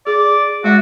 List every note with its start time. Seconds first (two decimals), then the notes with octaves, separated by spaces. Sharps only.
0.07 G#4 D5
0.64 G#3 F#4 E5